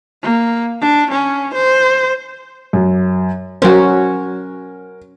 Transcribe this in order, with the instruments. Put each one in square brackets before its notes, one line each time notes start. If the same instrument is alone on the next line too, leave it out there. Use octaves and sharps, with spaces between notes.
[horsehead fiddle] A#3
D4
C#4
C5
[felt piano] F#2
[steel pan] F#3 C5 [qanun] C#4 F#4 [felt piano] A#4